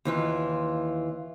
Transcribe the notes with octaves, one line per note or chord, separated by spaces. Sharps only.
D#2 E3 F4